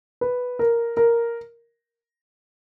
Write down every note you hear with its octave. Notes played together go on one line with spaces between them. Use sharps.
B4
A#4
A#4